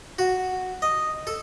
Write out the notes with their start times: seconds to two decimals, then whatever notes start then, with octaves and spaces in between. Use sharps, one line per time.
0.19 F#4
0.82 D#5
1.27 A4